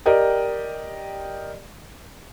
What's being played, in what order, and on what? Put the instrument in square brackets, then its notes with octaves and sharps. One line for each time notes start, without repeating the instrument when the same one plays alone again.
[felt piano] G4 A#4 D5 D#5 G5